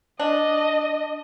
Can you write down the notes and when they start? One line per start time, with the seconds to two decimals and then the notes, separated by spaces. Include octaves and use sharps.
0.19 D4 D#5